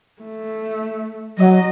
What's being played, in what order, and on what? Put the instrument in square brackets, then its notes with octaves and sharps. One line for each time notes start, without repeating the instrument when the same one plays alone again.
[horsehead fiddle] A3
[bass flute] F#3 [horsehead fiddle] D#5